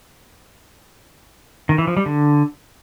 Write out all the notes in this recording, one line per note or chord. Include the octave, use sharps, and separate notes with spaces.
D#3
E3
F3
G3
D3